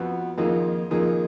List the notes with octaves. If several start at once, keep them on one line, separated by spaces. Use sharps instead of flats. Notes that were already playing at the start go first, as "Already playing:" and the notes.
Already playing: F2 F3 B3 F#4
F2 D#3 A#3 F4 G#4
F2 D#3 A#3 F4 G#4